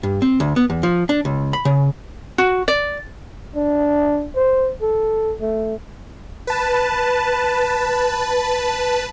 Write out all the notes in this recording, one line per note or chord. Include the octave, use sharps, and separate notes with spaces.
G2
C4
D2
B3
E2
F3
D4
C#2
B5
C#3
F#4
D5
D4
C5
A4
A3
B4 A5